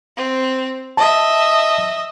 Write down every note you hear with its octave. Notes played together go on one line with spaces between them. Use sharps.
C4
D#5 E5 A5